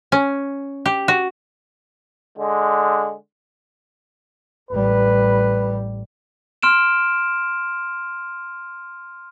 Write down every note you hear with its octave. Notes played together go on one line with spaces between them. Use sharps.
C#4
G4
F#4
D3 G#3
A1 G3 B4
C6 F6 D7 E7